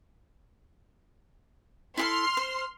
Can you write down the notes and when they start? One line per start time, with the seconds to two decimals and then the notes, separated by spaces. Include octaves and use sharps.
1.97 E4 G4 A4 C6 F6
2.37 C5